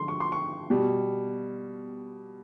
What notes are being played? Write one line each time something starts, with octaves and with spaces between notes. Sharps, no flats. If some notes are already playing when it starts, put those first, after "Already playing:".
Already playing: D3 F3 G#3 C6
C#6
C6
C#6
B2 G3